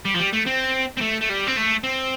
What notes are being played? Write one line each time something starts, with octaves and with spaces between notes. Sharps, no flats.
G3
F3
G3
A3
C4
C4
A3
A3
G3
C4
A3
C4